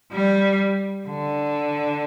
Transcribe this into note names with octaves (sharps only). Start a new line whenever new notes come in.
G3
D3